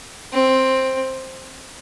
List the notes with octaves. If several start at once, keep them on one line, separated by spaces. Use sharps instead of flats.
C4